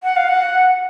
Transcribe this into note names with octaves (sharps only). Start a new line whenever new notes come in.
F#5
F5
F#5